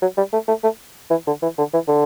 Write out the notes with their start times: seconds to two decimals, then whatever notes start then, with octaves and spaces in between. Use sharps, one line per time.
0.02 F#3
0.17 G3
0.33 A3
0.48 A3
0.63 A3
1.10 E3
1.27 D3
1.42 E3
1.58 D3
1.73 E3
1.88 D3